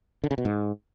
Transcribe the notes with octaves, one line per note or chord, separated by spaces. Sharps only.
D3
C#3
B2
G#2